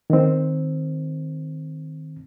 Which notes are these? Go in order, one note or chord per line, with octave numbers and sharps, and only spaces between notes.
D#3 C4